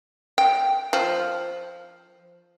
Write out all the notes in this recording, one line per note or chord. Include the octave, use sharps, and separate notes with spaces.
G5
F3